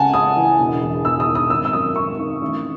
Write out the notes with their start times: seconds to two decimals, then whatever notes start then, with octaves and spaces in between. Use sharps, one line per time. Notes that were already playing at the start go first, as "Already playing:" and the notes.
Already playing: C#2 C#3 F#5 G#5 A5
0.14 C#2 D#6
0.37 E3
0.60 E1
0.82 E2
1.04 E1 E6
1.20 D#6
1.28 D#3
1.35 D#6
1.50 G#1 E6
1.65 E6
1.73 F#2 D#6
1.96 G#1 C#6
2.19 D#3
2.41 A1